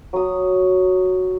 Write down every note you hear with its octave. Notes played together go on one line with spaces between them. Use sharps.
F#3 D#6